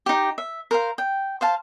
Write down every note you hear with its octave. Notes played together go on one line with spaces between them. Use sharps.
D#4 G4
E5
A#4 C5 F5
G5
C5 F5 A5